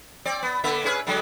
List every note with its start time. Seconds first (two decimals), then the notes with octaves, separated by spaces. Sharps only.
0.25 C4 D5
0.43 B3
0.64 D3 A#3 E5
0.84 C#4 G#4 B4
1.07 D3 F#3 G#3